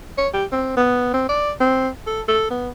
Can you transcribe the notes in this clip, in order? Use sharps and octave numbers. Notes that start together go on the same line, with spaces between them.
C#5
G4
C4
B3
C4
D5
C4
A4
A4
B3